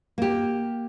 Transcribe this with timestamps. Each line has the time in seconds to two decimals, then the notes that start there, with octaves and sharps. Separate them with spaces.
0.18 A#3 G4